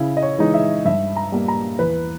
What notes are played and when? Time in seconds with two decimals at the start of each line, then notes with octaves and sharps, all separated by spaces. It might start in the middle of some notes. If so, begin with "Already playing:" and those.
Already playing: C#3 E4
0.17 D#5
0.23 C#5
0.38 E3 G#3 D#4
0.54 E5
0.85 G2 E5
1.16 A#5
1.32 G3 A#3
1.48 A#5
1.79 E2 B4